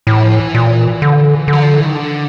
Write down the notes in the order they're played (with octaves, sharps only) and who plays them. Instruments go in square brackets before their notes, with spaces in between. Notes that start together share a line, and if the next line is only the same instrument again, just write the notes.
[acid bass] A2 [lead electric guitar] E3
[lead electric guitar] F3
E3
[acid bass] A#2
D3
[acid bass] D3 [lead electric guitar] F#3
[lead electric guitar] F3
E3
D#3
D3